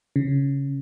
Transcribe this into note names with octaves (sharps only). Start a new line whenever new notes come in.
C#3